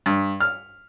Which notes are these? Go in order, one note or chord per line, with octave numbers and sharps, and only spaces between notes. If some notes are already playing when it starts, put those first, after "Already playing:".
G2
F6